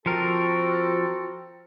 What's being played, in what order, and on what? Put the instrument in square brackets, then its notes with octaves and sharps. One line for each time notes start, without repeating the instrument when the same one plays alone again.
[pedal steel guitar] F3 A#4 [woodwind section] C4 F#4 A4